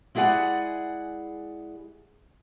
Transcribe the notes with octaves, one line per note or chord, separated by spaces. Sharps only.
G#3 E4 G#4 D5 F#5 G#5